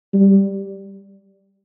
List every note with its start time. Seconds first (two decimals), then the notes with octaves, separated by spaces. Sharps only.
0.13 G3